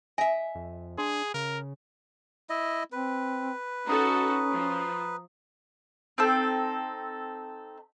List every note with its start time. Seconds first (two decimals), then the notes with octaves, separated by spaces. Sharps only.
0.18 D#5 E5 G#5
0.55 F2
0.98 D4 G#4 C6
1.34 C#3 A#4
2.50 E4 D#5
2.92 C4 B4
3.87 C#4 D#4 F#4 A4 A#5 D#6
4.52 F3
6.18 C4 D#4 A4